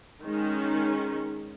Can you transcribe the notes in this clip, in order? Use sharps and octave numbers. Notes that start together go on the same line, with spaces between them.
D#3 G#3 C#4